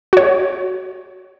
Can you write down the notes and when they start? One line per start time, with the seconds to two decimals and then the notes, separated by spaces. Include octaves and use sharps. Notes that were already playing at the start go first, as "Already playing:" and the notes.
0.13 F#4 C#5